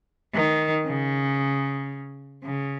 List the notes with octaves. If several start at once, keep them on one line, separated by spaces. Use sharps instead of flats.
D#3
C#3
C#3